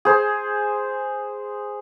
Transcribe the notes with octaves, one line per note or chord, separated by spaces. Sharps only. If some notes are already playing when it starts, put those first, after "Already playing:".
G#4 C5